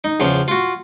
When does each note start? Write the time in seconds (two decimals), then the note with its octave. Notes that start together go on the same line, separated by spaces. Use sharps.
0.04 D#4
0.20 E2 C#3 F3
0.48 F4 F#4